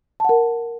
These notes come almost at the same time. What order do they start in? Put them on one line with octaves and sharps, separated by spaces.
A5 F#5 A#4